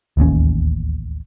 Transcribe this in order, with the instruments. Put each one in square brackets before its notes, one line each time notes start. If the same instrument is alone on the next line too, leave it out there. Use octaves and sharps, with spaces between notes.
[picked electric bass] D1 A1 D#2 C#4